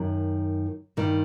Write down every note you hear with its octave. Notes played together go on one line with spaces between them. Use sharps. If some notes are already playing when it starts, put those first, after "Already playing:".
Already playing: F#2 D#3
G2 D#3